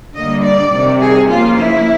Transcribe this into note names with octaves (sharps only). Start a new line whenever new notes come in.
D3 G3 A#3 D#5
D5
C3 D#3 G3
G#4
C#3 F3 A#3 F4
E4